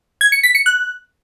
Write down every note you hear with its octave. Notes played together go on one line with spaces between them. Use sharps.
G#6
C#7
B6
C#7
F#6